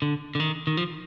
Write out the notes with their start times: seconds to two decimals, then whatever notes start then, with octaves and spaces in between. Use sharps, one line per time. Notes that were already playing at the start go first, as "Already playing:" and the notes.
0.02 D3
0.35 D3
0.40 D#3
0.67 D#3
0.77 F3